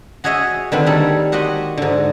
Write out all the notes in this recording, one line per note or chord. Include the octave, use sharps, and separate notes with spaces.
F#4 G#4 C#5 D#5 E5
D3 D#3 C4 B4
G3 A#3 A4 C#5
F#4 G4 C5 D#5 F#5
G#2 D3